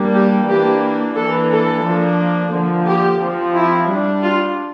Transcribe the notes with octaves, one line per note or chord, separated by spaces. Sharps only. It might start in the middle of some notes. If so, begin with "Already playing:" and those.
Already playing: G3 A#3 D4
G4
E3 A#3 D4 G4
E3 A#3 D4 A4
A4
F3 A#3 D4
D3 F3 A#3
G4
F3 C4
E4
G3 D4
F4